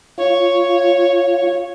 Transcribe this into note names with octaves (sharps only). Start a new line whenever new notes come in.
F4 C#5